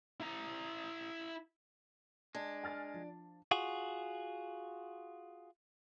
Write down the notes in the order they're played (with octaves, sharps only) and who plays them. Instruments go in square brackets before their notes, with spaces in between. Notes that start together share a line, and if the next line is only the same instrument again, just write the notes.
[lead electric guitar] E4 A#5
[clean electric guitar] G#3 [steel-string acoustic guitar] D4
[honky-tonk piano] G#5 F6 A6
F3
[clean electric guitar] F4 F#4 G#4